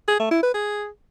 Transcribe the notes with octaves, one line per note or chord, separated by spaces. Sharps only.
G#4
A3
E4
B4
G#4